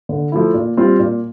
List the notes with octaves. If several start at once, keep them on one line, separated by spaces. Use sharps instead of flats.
D3
F3 A3 E4
A#2
G3 C4 F4
A#2